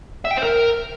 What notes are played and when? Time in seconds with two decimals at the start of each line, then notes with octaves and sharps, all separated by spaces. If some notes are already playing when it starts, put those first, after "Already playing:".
0.25 E5
0.31 G5
0.37 C5
0.43 A#4